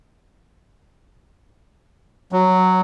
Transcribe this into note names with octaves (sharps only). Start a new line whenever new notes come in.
F#3